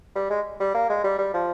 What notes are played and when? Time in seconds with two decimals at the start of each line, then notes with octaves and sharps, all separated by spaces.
0.16 G3
0.30 G#3
0.60 G3
0.74 A#3
0.90 G#3
1.04 G3
1.19 G3
1.34 F3